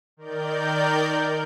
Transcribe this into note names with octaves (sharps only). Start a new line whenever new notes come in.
D#3 A#4 D5 G6